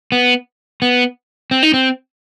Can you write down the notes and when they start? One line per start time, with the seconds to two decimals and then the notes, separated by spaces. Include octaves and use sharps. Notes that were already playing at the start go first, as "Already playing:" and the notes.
0.12 B3
0.82 B3
1.51 C4
1.63 D#4
1.74 C4